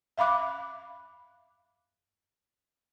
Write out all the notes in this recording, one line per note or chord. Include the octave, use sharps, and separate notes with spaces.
E5 F5 B5 D6 F#6